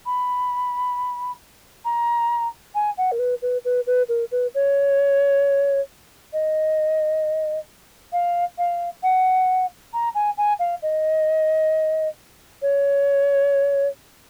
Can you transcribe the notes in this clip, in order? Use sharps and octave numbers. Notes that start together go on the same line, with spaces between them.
B5
A#5
G#5
F#5
A#4
B4
B4
B4
B4
A#4
B4
C#5
D#5
F5
F5
F#5
A#5
G#5
G#5
F5
D#5
C#5